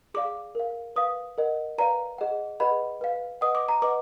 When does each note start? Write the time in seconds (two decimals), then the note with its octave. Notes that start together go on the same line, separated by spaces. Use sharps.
0.14 G#4 D5 F5 D6
0.55 A#4 F5
0.96 B4 F5 D#6
1.38 A#4 D#5 F#5
1.78 B4 D5 F5 A#5
2.18 G#4 D#5 F#5
2.60 G#4 B4 D#5 F#5 B5
3.01 B4 F5
3.41 B4 D#5 F#5 D#6
3.55 D6
3.69 A#5
3.82 B4 D#5 F#5 D6